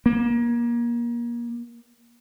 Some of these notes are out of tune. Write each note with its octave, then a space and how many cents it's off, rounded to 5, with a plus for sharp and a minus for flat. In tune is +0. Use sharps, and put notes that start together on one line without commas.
A#3 +30